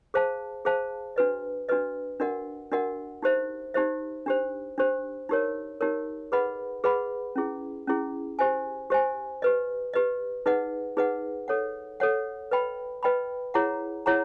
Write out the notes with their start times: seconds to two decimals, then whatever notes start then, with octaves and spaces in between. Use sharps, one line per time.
0.14 G#4 C5 F5 A5
0.65 G#4 C5 F5 A5
1.16 D4 F#4 B4 D#5
1.69 D4 F#4 B4 D#5
2.20 D4 F#4 A#4 D#5 F#5
2.71 D4 F#4 A#4 D#5 F#5
3.22 D#4 G4 C5 E5
3.74 D#4 G4 C5 E5
4.26 D4 G4 C5
4.78 D4 G4 C5
5.29 D#4 G4 A#4 C#5
5.81 D#4 G4 A#4 C#5
6.32 G#4 B4 D#5 F#5 B5
6.84 G#4 B4 D#5 F#5 B5
7.36 C#4 E4 G#4
7.87 C#4 E4 G#4
8.39 G4 C5 E5 G#5
8.90 G4 C5 E5 G#5
9.42 G4 B4 D#5
9.93 G4 B4 D#5
10.46 D#4 G#4 B4 D#5 F#5
10.97 D#4 G#4 B4 D#5 F#5
11.48 A4 C#5 F#5
12.00 A4 C#5 F#5
12.51 B4 D#5 G5 B5
13.03 B4 D#5 G5 B5
13.54 E4 G#4 C#5 F#5 A#5
14.06 E4 G#4 C#5 F#5 A#5